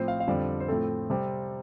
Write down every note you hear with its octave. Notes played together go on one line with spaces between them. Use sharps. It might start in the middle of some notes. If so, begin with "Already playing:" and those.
Already playing: A2 F3 C4 C5
F5
F5
F2 D3 G3 C4 D5
C5
A2 F3 A3 C4 A4
C3 G3 C4